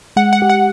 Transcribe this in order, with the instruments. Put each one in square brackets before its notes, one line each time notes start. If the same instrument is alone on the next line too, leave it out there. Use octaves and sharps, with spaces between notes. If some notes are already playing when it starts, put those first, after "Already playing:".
[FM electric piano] G#3 [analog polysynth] F#5
[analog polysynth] F#5
[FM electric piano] G4
[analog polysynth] F#5